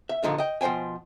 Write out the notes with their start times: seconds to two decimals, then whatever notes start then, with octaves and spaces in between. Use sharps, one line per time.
0.09 E5
0.23 G2 A#2 D3 F3 D#4
0.38 D#5 G5
0.61 B2 F3 C5 G5 G#5